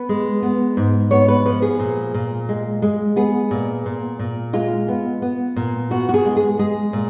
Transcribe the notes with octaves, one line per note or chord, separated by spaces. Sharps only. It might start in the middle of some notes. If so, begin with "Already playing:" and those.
Already playing: B3 B4
G#3
B3
G#2
B3 C#5
B4
F3 B4
G#4
A#2
A#2
G#3
G#3
B3 G#4
A#2
A#2
A#2
G#3 F4
B3
B3
A#2
B3 F#4
F#4
G#4
G#3
G#4
G#3 G#4
A#2